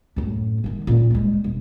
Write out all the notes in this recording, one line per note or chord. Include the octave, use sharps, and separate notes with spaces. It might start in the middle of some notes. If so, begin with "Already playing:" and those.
F#2 A2
G#2 D#3
A#2 C#4
G3 G#3
E1